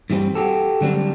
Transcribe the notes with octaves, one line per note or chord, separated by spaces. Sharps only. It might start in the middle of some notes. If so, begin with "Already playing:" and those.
G2 E3 G3 C4
F#4 G4 A4
D3 F#3 G3 C4 D4